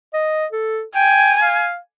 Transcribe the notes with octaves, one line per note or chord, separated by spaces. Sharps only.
D#5
A4
G5 G#5
F5